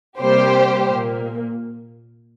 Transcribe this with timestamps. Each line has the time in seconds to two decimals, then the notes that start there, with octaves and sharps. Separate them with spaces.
0.19 C3 G3 A#3 G4 C5
0.86 A#2 A#3